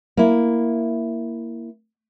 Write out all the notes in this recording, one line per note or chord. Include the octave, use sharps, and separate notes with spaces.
A#3 E4